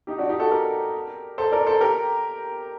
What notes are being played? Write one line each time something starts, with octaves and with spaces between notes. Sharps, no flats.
D#4 G4
D4 F#4
D#4 G4
F#4 A4
G4 A#4
A4 C5
A#4 D5
A4 C5
G4 A#4